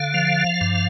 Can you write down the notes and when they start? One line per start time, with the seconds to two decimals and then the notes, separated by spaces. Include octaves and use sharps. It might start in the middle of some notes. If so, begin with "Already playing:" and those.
Already playing: D3 F5
0.14 F3
0.61 G2